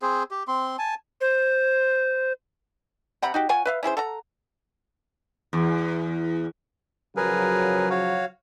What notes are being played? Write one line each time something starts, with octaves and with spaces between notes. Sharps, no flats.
C4 G#4 C5
G4
C4 C6
G#5 A5
C5
C3 F#5 A#5 B5
D#4 F#4 G4
F4 C#5 F#5 G#5
B4 E5 F5
C#4 E4 G#4 C5
A4 F#5 A#5
E2
C#3 F3 F#3 G#4 A#4 B4
F#4 C#5 F5